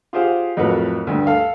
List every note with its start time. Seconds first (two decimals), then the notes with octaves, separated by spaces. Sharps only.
0.13 F4 G4 G#4 C5 F5 F#5
0.57 F2 A2 F#3 A#4 B4
1.07 D2 G2
1.27 A4 F5